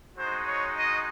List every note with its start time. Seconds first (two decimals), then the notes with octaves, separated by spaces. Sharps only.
0.16 G#3 D#4 F#4 C5
0.45 C#5
0.75 D#5